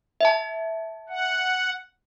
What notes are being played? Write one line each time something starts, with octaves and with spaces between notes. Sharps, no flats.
E5 A5
F#5